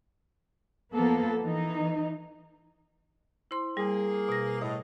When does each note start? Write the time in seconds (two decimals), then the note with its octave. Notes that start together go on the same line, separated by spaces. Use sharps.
0.92 F3 A#3 B3 A4
1.43 E3 D#4
3.51 E4 C5 C6
3.77 G3 A#3 G#4
4.29 B2 A#6
4.61 A2 D#5